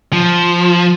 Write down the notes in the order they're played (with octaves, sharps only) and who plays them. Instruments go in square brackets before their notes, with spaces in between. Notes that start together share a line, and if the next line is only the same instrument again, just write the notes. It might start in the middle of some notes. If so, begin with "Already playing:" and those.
[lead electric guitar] F3